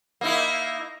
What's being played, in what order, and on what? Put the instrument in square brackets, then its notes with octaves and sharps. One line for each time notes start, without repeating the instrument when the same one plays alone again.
[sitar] A#3 D#4 E4